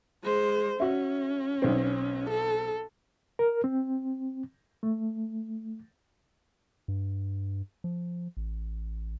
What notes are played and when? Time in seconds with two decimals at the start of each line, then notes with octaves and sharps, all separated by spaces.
0.23 G#3 C5
0.80 C#4 F#4 E5
1.62 B1 C4
2.30 A4
3.39 A#4
3.64 C4
4.83 A3
6.88 G2
7.84 F3
8.37 A1